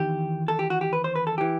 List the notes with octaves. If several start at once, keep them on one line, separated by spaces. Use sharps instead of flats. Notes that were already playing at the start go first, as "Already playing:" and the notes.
Already playing: E2 D#3 G4
A4
G4
F#4
G4
B4
C5
B4
A4
E3 G4